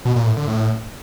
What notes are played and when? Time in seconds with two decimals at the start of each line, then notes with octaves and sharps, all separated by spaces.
0.05 B2
0.16 A#2
0.26 A2
0.37 D3
0.47 A2